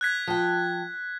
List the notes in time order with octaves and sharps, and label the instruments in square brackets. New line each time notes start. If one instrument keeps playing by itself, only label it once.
[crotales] F#6 G#6 B6
[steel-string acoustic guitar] F3 G5